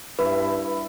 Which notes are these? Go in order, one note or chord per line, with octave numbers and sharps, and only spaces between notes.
G2 E4 B4